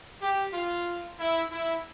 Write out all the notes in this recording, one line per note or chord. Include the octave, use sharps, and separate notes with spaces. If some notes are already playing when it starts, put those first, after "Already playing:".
G4
F4
E4
E4